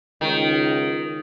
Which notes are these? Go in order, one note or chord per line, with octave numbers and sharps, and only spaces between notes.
C#2 D#3